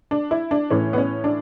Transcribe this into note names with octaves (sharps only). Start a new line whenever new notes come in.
D4
E4
D4
A2 E3 C#4
B3
C#4
D4